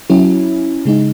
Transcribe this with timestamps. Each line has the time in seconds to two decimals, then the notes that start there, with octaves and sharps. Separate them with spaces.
0.10 F#3 C#4 E4
0.85 C#3 G#3 D#4